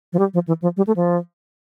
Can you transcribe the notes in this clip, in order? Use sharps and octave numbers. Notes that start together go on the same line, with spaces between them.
F3
G3
F3
E3
F3
G3
A3
F3